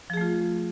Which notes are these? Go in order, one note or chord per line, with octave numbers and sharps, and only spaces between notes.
F3 A3 F4 G#4